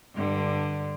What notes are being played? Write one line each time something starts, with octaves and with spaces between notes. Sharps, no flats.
G2 D3